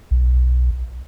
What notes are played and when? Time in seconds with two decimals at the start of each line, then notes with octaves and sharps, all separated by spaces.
0.11 B1